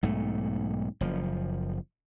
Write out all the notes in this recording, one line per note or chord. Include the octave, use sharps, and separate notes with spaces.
B1 G#2 A3
F#1 F3